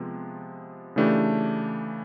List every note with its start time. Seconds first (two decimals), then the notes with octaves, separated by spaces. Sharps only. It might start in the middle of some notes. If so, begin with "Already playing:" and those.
Already playing: C3 F3 G#3 B3
0.96 C#3 E3 A3 D4 G4